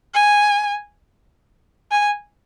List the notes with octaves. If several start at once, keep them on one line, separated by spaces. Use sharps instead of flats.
G#5
G#5